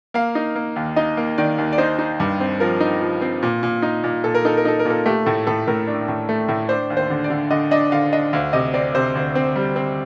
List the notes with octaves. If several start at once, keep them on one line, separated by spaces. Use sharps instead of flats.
A#3 F5
D#4
A#3
D#2
D#4 D#5
A#3
D#3 D5
D#2
D5
D#4 C5
D#4
G2
C4
F3 A#4
D#4
F3
C4
A#2
A#2
D#4
A#2
A#2 A4
A#4
D#4 A4
A#4
D#4 A4
A#4
A#2 A4
A3 G4
A2 A4
A2 A4
A2 A#4
D4
A2
A3
A2
D4 C5
D#2
C5
D3
D5
D3
D3 D#5
D4 D#5
D3 F5
D4 D#5
D2 F5
C3 D#5
C4 D5
C3 C5
D2
C4
G3
C4